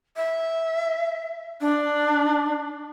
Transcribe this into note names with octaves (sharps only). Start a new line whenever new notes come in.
E5
D4